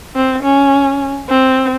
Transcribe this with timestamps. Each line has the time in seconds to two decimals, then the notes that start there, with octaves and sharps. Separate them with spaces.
0.16 C4
0.44 C#4
1.29 C4